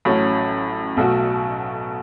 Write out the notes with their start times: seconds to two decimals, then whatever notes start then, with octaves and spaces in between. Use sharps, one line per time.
0.05 A1 A2 F#3 C#4
0.97 B1 B2 F#3 A3 F#4